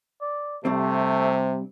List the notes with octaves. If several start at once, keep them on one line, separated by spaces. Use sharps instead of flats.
D5
G2 C3 G3 A3 C4